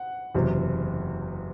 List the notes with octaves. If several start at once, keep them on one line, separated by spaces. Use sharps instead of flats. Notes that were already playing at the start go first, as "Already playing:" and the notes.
Already playing: F#5
F#1 E2 C3 F#3